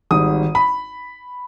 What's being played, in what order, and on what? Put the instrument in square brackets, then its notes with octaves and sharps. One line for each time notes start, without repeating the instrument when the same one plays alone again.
[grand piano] G#1 G#2 G3 D#6
B5